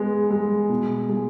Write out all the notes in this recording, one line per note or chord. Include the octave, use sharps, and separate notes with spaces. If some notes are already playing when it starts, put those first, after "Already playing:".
Already playing: G#3 B3
G#3
B2
G#3